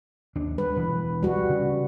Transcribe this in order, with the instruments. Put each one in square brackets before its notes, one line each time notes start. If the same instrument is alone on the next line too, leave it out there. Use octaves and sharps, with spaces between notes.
[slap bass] D#2 D4
[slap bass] G3 [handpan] B4
[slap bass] E1 E3
[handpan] G3 F#4
[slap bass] C#3